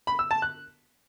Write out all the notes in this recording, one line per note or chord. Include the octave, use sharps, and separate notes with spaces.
B5
E6
A5
F#6